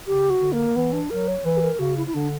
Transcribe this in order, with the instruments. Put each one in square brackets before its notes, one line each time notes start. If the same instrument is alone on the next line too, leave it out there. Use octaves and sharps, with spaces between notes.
[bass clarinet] C#3 [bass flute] G4
[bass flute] F#4
[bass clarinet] D3
[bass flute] A#3
[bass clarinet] E3 [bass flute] B3
[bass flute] D4
[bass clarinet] F#3 [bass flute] A#4
[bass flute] C#5
[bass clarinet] E3 [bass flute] B4
[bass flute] G4
A#4
[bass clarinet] C#3 [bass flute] F#4
[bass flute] E4
E4
[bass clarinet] D3 [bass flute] D4